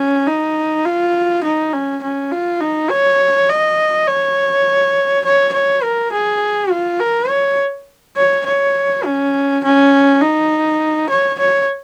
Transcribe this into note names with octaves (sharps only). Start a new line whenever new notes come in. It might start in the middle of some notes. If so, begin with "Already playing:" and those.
Already playing: C#4
D#4
F4
D#4
C#4
C#4
F4
D#4
C#5
D#5
C#5
C#5
C#5
A#4
G#4
F4
A#4
C#5
C#5
C#5
C#4
C#4
D#4
C#5
C#5